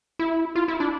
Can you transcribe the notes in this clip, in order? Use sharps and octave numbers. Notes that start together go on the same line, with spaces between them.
E4
F4
E4
D4